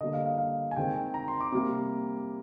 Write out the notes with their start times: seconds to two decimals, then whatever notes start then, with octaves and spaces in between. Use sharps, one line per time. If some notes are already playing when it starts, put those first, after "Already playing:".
0.01 D3 G3 A#3 D#5
0.13 F5
0.26 F5
0.38 F5
0.71 G#5
0.76 D#3 G#3 C4 G5
1.14 A#5
1.28 C6
1.41 D6
1.52 C3 G3 A#3 D6